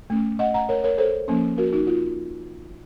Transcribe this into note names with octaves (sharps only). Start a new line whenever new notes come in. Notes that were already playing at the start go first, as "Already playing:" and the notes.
A3 C#4
D#5 F#5
F#5 A#5
A#4 C#5
A#4 C#5
A4 C5
F3 A#3 C#4
F#4 A#4
D#4 F#4
F4